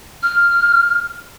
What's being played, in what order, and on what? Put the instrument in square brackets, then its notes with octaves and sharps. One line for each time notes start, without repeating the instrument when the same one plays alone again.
[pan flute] F6